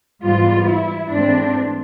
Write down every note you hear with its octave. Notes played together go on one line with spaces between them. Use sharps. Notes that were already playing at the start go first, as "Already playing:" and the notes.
G#2 E3 G3 B3 F4
E4
G#2 E3 A3 C4 D4